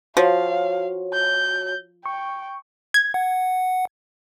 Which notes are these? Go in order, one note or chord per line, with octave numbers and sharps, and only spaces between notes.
F3 F#4 C#5 F5
G6
G5 C#6
G#6
F#5